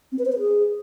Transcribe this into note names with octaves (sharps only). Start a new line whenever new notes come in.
C4
B4
C5
B4
G#4